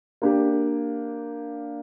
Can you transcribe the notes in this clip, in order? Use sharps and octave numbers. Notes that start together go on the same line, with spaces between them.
A#3 D4 G4